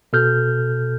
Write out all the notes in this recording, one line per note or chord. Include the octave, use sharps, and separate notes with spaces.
B2 A4 F6 G6